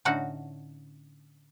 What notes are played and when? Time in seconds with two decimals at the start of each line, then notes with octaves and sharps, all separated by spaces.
0.05 A2 D3 C#4 D#4 F#4 F#5